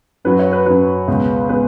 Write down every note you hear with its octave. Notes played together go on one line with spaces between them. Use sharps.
F#2 F#3 B4
C#5
B4
F#2 F#3 B4
C#2 B2 G#3
B2 G#3 B4